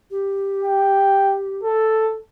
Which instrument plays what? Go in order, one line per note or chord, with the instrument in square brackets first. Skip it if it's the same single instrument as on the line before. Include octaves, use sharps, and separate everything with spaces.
[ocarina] G4
[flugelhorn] G5
A4